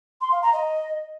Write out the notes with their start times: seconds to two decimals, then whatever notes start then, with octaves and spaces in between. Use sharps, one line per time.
0.21 C6
0.32 F5
0.42 A#5
0.53 D#5